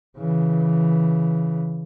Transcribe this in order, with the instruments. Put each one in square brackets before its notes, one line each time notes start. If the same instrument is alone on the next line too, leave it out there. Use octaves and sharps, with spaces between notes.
[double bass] C#3 E3